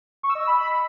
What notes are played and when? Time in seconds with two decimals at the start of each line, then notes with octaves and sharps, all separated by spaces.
0.23 C#6
0.29 E6
0.35 D#5
0.41 E6
0.47 B5